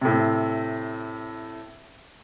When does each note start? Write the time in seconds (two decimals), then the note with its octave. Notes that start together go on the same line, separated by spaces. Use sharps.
0.01 A2 C3